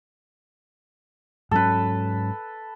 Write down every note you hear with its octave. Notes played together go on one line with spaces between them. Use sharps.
G#2 F#3 C#4 A4 B4